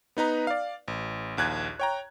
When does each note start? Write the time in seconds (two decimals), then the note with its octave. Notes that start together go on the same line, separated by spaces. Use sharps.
0.17 B3 D#4 B4 A#5
0.47 D5 F5
0.88 A1
1.37 A#1 D#2 F#6 G#6
1.79 C#5 G5 A#5